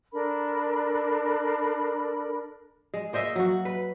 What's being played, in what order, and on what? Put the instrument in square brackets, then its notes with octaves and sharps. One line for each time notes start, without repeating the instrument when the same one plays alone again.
[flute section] D4 A4 A#4 B5
[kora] G#3
A#3 C5 D#5 E5
F#3 F#4
B4